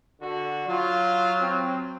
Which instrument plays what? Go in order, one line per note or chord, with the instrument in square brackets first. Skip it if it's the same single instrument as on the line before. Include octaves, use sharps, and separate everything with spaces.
[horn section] D3 F#4
[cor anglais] F#3 [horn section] F4
[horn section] C4